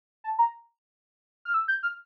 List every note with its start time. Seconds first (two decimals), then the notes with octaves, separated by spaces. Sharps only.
0.24 A5
0.39 A#5
1.45 F6
1.54 E6
1.68 G6
1.83 F6